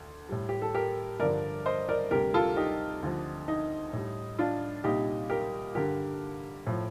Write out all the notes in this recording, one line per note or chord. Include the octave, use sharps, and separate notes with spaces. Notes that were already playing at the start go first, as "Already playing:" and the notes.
Already playing: D2
A2 G3
G4
A4
G4 A#4
G2 D3 F3 A#4 D5
C5 D#5
A#4 D5
D2 C3 G3 G4 A#4
F4 A4
D#4 G4
D2 D3 F3
D#4
A2 G3
D4 F4
C2 A#2 G3 D#4 G4
G4 A#4
G2 D3 G3 G4 A#4
A2 F3